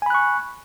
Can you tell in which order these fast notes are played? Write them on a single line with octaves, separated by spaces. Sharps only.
G#5 B5 F#6 C#6